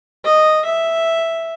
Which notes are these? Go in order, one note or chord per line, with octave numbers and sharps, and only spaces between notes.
D#5
E5